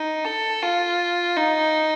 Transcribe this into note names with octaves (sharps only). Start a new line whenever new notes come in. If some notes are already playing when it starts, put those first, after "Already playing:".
Already playing: D#4
A4
F4
D#4